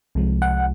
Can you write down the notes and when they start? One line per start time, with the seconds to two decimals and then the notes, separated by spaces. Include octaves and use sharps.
0.15 C2 C3 F3 G#3
0.42 F#5